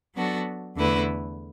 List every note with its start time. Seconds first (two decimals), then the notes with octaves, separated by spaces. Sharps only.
0.15 F#3 B3 D4 F#4 A4
0.76 E2 D3 A3 E4 B4